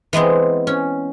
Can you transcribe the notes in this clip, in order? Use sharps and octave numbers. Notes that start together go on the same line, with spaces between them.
E3 G#3 B3 C4
C#4